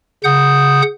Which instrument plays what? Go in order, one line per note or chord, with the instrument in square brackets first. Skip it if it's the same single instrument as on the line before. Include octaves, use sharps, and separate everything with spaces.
[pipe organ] C#3 F#5 D#6 G6